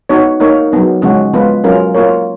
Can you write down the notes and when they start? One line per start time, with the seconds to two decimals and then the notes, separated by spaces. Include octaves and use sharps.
0.09 B3 D#4 F#4 C#5
0.40 A#3 D#4 A#4 C#5
0.72 F#3 B3 D#4
1.02 C#3 F3 G#3 C#4 F#4
1.33 F3 G#3 B3 F4 B4
1.64 F#3 C#4 F4 A#4
1.94 A#3 F4 A#4 C#5